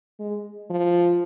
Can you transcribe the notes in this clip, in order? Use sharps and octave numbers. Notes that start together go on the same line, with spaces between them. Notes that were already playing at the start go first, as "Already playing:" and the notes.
G#3
F3